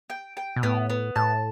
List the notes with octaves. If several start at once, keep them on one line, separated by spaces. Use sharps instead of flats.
G5
G5
B2
A2 B3
B3
A2 A5